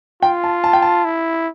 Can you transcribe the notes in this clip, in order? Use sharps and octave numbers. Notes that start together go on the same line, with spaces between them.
F4 G5
A5
A5
G5
A5
E4